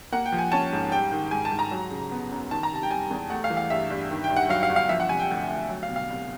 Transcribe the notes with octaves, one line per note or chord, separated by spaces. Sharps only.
A#3 F#5
G5
F3
G#5
C#4 A5
G#2
G3 G5
D#3
G#2 G#5
A5
G#2
A#5
F#3
C#3
B3
F#2
D#3 A5
A#5
C3 A5
G5
G3 G#5
E2
A3 F#5
F5
E3
F5
G2 E5
G2
D#3
G5
G2
F#5
F#3 F5
F5
G1
F5
F3 E5
F#5
C3 G#5
G5
D2
D2
F#3
F5
B2
F5
C2